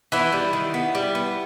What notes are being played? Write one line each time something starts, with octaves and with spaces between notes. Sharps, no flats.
E3 B3 E4
G3
D#3
B3
G3
B3